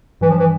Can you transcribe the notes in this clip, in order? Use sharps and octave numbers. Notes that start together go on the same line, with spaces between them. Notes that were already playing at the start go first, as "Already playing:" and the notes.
G2 E3
F3
E3